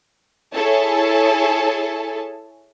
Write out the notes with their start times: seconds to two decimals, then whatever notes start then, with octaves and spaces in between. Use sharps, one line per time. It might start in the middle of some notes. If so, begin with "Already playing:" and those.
0.54 E4 G#4 A4 C#5 A5